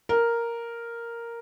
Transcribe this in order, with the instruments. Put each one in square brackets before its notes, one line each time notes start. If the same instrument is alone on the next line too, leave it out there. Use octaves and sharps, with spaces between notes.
[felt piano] A#4